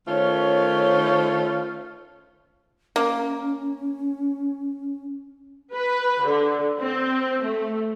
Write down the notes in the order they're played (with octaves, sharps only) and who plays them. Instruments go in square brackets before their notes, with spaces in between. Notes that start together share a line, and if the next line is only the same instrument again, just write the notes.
[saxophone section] D#3 A3 C#4 F4 C5 C#5
[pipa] A#3 [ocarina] C#4
[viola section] B4
D3
C4
A3